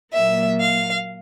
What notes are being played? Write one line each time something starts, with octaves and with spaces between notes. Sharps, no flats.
A#2 F#3 A#3 E5
F5